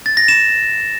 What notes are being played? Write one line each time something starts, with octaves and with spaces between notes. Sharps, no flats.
A6
A#6
E7